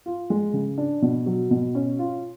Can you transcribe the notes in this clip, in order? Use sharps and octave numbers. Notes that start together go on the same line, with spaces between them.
F4
G#3
C#3
D4
B2
F#3
B2
C#4
F4